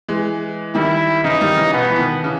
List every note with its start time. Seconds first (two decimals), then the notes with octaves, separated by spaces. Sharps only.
0.08 E3 G#3
0.75 D#3 G3 E4
1.24 C#3 E3 D#4
1.41 D#3 G3
1.57 C#3 E3
1.73 B2 B3
1.90 E3
1.99 B2 D#3
2.24 C#3 E3